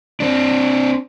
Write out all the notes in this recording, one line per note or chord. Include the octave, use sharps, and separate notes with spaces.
C4 D4